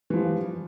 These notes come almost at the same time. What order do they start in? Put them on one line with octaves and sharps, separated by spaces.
E3 F3 G3